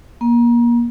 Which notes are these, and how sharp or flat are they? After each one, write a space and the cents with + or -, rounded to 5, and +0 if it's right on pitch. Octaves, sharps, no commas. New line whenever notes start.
A#3 +30